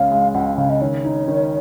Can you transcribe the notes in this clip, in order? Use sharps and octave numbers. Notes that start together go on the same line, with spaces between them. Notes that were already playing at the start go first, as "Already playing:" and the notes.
Already playing: C#2 C#3 G#3 C#4 F5
G#3
C#2 F#5
F5
C#3 F5
D#5
D#3 C#5
D#4
D#3